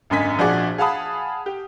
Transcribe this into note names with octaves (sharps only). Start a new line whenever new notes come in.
G#1 F#2 D3 D#5 G#5 B6
A#1 F3 D4 F#4 G#4 D6
G#4 F5 F#5 A5 B5 D#6
G4